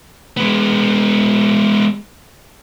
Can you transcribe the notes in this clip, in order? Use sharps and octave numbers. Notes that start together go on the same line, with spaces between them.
G#3 B3